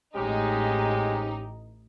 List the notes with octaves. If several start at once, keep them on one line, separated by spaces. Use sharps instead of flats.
A1 G#3 C4 C#4 D#4 G4